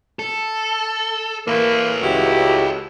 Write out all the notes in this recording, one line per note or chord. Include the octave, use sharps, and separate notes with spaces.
A4
E3 A#3 A4 B4
C#2 E4 F#4 G4